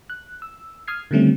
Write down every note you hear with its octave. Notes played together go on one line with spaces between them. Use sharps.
F#6
E6
D#6 F6 G#6 C7
D3 D#3 G3 A3 C4 C#4